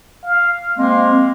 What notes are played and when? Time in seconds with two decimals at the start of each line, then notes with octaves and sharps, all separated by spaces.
0.24 F5
0.78 G#3 A#3 C4 C6